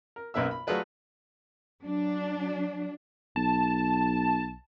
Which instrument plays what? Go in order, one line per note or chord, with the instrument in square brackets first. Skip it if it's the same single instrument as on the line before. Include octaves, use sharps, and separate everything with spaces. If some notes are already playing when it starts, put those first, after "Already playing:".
[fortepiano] A#4
B1 F#2 A#3 B4 E5 E6
B5
F#3 A3 F4 G#4 B4 D5
[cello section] F#3 D4
[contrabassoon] B1 [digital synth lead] A5